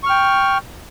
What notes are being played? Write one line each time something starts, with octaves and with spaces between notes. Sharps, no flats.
G5 C#6 F6